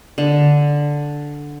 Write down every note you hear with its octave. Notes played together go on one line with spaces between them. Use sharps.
D3